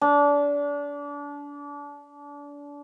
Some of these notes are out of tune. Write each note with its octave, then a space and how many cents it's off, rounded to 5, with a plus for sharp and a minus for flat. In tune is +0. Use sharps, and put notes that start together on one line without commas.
D4 -30